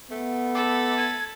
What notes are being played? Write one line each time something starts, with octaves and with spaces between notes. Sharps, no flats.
A3 B3
A4 B5 D6
G#6